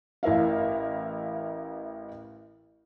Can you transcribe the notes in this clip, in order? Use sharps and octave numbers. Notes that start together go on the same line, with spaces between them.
A1 E4 A#4 E5 F5